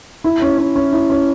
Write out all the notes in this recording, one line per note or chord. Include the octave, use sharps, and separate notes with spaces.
E4
C#4
C#4
C#4
E4
C#4